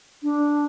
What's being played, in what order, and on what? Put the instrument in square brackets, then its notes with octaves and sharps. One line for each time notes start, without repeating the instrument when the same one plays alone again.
[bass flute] D4